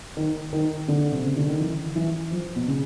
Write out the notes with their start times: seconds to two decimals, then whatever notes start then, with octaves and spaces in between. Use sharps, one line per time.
0.17 D#3
0.53 D#3
0.88 D3
1.12 C3
1.24 C#3
1.36 D3
1.48 D#3
1.60 E3
1.96 E3
2.31 F3
2.56 B2
2.68 C#3